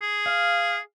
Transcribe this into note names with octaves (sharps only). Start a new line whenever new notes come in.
G#4
F5